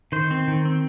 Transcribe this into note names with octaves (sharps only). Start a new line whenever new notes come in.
D#3 C5
C4
D#3
C4